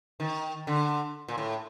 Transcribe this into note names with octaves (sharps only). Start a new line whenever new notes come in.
D#3
D3
A#2
A2